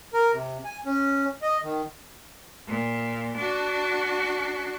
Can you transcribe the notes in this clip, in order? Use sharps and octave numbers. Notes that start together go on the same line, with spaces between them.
A#4
C3
G#5
C#4
D#5
D#3
A#2
D4 F#4